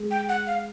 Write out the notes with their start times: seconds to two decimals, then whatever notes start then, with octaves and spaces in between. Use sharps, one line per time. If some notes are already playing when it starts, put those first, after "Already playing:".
Already playing: G#3
0.11 G5
0.29 F#5
0.47 F5